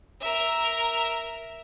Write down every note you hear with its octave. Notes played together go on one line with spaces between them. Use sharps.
A#4 E5